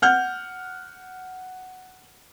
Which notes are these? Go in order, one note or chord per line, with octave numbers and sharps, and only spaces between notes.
F#5 F6 G6